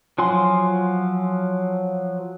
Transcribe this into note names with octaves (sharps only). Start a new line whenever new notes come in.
F3 F#3 G#5 C6